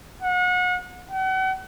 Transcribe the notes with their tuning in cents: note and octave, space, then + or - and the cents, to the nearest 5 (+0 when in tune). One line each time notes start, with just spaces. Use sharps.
F#5 -35
F#5 +40